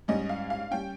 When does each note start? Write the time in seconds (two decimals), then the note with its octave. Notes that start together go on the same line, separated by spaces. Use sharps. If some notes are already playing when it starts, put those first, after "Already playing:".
0.08 G#2 G3 C#4 D#5
0.29 F5
0.50 F5
0.71 G3 C#4 G5